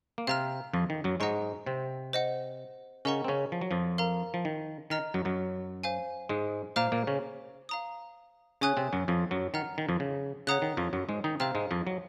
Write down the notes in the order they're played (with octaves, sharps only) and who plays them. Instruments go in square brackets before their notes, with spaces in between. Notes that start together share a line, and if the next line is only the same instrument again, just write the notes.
[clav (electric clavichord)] A#3
[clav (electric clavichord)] C3 C4 [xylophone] F5 A#5 F6
[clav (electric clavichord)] F2 F3
D#3
F#2 F#3
[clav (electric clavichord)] G#2 G#3 [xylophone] D#5 F#5 A#5 C#6
[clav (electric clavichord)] C3 C4
[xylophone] C5 D#5 F#5
[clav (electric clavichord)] C#3 C#4 [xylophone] A#4 D#5 F#5 A#5 C#6
[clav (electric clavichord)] C4
C#3 C#4
F3
F#3
F2 F3
[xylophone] A#4 F5 A#5
[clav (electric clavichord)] F3
D#3
[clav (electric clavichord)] D#3 [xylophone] D#5 A#5 F6
[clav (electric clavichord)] F#2 F#3
F#2 F#3
[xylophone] C5 F5 G#5
[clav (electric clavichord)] G#2 G#3
[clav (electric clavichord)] A#2 A#3 [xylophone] C5 F5 A#5 F6
[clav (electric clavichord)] A#2 A#3
C#3 C#4
[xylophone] F5 A#5 D#6
[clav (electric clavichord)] C#3 C#4 [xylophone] C#5 G#5 D#6 F#6
[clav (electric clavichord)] C3 C4
F#2 F#3
F2 F3
F#2 F#3
[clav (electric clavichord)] D#3 [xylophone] F#5 A#5 F6
[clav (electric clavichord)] D#3
F2 F3
C#3
[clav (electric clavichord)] C#3 [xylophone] C#5 F#5 A#5 D#6 F#6
[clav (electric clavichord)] D#3
F2 F3
F#2 F#3
G#2 G#3
D#3 D#4
[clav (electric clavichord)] C3 C4 [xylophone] C5 F5 A#5 F6
[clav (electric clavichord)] G#2 G#3
F2 F3
F#3